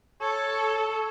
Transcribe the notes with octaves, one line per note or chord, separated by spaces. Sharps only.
A4 C#5